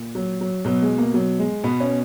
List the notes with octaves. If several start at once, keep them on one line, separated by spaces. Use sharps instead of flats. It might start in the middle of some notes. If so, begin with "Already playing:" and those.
Already playing: A#2
F#3
F#3
B2 F#3
G#3
A#3
F#3
G#3
B2 B3
C#4